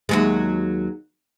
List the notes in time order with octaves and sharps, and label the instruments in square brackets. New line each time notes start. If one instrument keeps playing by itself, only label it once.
[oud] D#2 F#3 G#3